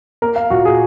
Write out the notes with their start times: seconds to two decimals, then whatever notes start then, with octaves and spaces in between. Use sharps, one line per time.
0.22 A#3 A#4
0.36 F5
0.50 A#2 F#4
0.65 G#4